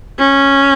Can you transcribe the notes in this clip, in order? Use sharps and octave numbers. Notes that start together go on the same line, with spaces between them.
C#4